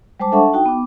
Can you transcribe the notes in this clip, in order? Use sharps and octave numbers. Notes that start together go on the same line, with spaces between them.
G3 G#3 C5 A5 D6
D4 A4 E5 F#5 A5 C#6
D#4 F#4 G5
B3 D6